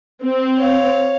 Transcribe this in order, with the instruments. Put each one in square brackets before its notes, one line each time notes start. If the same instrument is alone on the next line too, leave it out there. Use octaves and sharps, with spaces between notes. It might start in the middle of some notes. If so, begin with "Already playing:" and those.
[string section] C4
[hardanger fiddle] C#5 F5